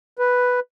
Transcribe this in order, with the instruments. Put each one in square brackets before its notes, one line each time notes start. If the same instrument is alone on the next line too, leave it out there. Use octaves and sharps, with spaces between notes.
[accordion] B4